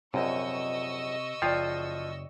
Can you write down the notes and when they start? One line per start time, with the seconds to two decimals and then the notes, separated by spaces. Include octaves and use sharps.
0.14 A#1 F#2 C3 D#5 C#6 E6
1.42 F#1 F3 F4 D5 G5